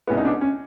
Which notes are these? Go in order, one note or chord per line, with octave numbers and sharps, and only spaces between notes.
C2 B2 G#3 B3 C#4 E4
D#4
D4
C#4